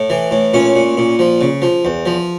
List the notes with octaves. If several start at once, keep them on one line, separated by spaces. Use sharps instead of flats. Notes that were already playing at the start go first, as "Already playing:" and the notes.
Already playing: A2
E3
A2
A#2 C#4
A#2
A#2
F3
C#3
F3
E2
F3